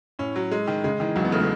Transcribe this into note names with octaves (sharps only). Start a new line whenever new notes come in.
A2 C#4
F#3
G#3
D#3
C#3 G#3
D#3 E3
E1 F#3
B3
C#3 A3
G#3